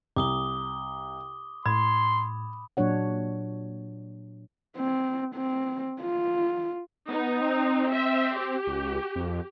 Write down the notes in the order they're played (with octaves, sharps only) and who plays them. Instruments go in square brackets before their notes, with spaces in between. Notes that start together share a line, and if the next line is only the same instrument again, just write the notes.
[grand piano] C2 [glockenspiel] D6 D#6 G7
[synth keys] A2 [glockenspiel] B5 [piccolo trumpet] C6 [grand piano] G#6
[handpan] A#2 F#3 D4 C#5 F#5
[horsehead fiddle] C4
C4
F4
[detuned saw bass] B3 [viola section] D#4
[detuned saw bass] C4
[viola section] E5
G4
[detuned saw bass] C#2
F2